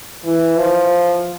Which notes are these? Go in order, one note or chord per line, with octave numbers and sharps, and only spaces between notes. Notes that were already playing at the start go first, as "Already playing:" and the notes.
E3
F3